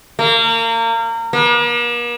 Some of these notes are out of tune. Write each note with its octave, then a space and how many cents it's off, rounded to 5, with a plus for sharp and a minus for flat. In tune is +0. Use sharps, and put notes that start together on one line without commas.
A#3 -30
A#3 +45